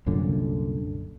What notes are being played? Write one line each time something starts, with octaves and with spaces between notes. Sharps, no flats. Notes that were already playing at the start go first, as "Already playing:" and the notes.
C2 F#2 A#2 D3